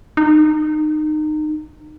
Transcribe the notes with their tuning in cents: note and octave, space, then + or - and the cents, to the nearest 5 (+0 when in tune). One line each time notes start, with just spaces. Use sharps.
D#4 -25